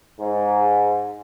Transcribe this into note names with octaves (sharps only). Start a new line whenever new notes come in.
G#2